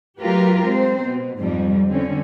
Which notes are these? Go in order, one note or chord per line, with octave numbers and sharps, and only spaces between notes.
F#3 A3 F4 G4 A#4 B4
G#3 C4 C5
B2
F2 G#2 C3 F3 G3
D3 C4 C#4